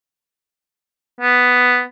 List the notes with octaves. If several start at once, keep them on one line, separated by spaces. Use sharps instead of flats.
B3